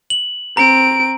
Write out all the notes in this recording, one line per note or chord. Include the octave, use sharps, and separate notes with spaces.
F#7
C4 A#5 D7